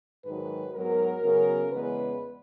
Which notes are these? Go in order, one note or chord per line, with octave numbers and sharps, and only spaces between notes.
G#2 D#3 F#3 B4
G#2 F#3 B3 A#4
C#3 F#3 B3
E2 C#3 G#3 B3 B4